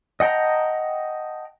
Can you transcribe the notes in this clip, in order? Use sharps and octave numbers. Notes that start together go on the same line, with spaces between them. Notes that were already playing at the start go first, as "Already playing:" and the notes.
D#5 F#5 G5 A5 A#5